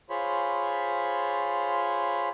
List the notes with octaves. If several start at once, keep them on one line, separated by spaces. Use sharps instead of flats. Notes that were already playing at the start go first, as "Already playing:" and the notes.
F4 G#4 C5 C#5 B5